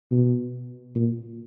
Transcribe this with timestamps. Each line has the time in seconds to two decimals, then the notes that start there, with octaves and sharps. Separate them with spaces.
0.11 B2
0.95 A#2